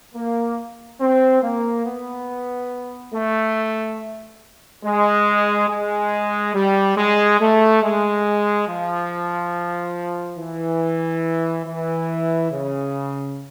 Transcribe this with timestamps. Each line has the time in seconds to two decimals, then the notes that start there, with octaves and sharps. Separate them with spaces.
0.15 A#3
1.00 C4
1.42 A#3
1.84 B3
3.13 A3
4.83 G#3
5.68 G#3
6.54 G3
6.96 G#3
7.39 A3
7.82 G#3
8.67 F3
10.38 E3
11.65 E3
12.50 C#3